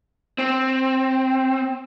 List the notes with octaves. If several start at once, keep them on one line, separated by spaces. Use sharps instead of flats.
C4